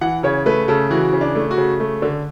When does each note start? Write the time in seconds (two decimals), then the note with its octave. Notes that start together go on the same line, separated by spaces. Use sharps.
0.01 E3 F#5
0.23 C#3 C#5
0.46 A3 B4
0.68 C#3 A4
0.91 E3 F#4
1.13 C#3
1.21 D4
1.35 A3
1.51 F#4
1.57 C#3
1.80 A3
2.02 D3